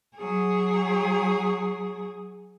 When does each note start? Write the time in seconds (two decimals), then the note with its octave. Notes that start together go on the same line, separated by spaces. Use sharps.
0.17 F#3 G#4